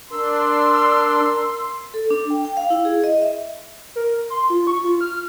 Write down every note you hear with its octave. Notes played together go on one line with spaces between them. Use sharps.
D4 A#4 C6 E6
A4
D4
G5
G5
F5
E4
G#4
D#5
E5
A#4
C6
F4
C#6
F4
F6